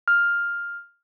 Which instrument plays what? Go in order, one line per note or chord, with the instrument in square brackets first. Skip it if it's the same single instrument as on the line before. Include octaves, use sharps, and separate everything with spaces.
[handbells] F6